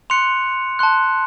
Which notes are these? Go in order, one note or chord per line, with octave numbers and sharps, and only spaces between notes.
C6 F#6 C#7 F7
A5 C6 F#6